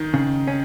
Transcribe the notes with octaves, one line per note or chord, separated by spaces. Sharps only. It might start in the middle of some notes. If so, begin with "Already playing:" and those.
Already playing: D#3 D#4
C#3
C#4